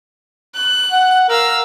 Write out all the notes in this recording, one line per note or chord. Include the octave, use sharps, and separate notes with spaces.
F#6
F#5
A#4 F5 E6